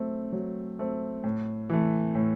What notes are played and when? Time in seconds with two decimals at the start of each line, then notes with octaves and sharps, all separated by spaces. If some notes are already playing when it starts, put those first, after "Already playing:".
Already playing: F#3 A3 C4
0.32 F#3
0.79 A3 C4
1.24 A2
1.70 E3 A3
2.15 A2